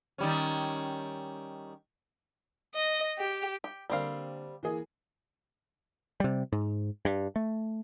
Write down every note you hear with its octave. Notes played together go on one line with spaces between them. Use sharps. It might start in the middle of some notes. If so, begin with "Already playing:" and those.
D#3 G3 C#4
D#5
G4
G4
D3 G3 A#3 C4 F5
E3 A#3 G#4
C3 G3
G#2
G2
A3